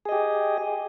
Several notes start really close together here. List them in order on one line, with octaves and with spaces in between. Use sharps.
G#4 D#5 G4